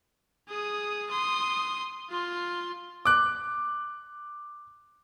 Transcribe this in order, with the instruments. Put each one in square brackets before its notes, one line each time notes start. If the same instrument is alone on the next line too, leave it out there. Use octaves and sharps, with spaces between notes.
[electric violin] G#4 D#6
C6 D#6
F4 C6
[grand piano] D6 F#6